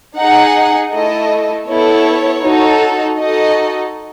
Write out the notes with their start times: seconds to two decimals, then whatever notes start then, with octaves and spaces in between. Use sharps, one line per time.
0.18 D#4 G#4 F#5
0.93 A3 E4 A4 D#5
1.68 B3 E4 A4 C#5
2.43 D#4 F#4 A4
3.19 D#4 F#4 A4 D#5